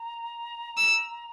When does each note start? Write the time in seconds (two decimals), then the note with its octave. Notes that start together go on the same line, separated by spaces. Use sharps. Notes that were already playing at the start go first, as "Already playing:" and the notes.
Already playing: A#5
0.77 E6